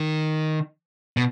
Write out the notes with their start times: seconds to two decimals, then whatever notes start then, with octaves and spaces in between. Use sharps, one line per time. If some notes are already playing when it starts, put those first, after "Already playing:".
Already playing: D#3
1.17 B2